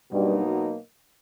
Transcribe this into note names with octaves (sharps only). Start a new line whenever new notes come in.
G2 B2 F#3 A#3 D#4